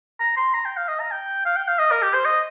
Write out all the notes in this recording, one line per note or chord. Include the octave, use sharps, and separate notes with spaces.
A#5
C6
A#5
G5
F5
D#5
A#5
G5
F5
G5
F5
D#5
A#4
G4
C5
D#5